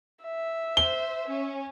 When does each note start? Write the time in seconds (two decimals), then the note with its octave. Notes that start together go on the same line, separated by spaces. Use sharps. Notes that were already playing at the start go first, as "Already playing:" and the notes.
0.25 E5
0.77 C5 G7
1.28 C#4